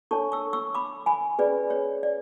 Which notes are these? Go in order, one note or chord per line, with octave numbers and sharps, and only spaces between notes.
D4 A4 C#5 A5 C#6
C#6 E6
C#6 E6
B5 D6
G#5 B5
C#4 G#4 B4 D5
C#5
D5